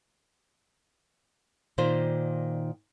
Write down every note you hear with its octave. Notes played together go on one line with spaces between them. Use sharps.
A#2 D#3 F4 C5 D5